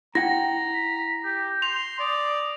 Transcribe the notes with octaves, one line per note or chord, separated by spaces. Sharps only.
E4 F#5 G5 A#5 A#6
B6
G4 G6
C6 F7
D5 D#6